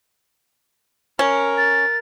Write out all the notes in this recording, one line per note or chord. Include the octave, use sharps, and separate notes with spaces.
C#4 A#4
A6